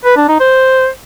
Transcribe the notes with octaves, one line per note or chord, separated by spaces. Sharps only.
B4
D4
D#4
C5